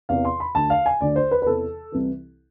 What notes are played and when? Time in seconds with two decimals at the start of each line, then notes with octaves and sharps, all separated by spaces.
0.09 E2 C3 E3 F5
0.25 C6
0.40 B5
0.55 D2 D3 A5
0.70 F5
0.86 G#5
1.01 D2 D3 D5
1.16 C5
1.31 B4
1.42 B4
1.46 E2 C3 E3 A4
1.92 C2 C3 E3